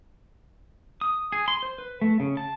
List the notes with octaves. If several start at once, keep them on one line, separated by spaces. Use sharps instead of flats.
D#6
G#4
C6
C5
B4
A3
C#3
A5